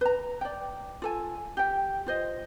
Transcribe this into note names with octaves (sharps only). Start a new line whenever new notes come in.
B4 A#5
D5 G5
F4 A4 G#5
G4 G5
F4 C5 D#5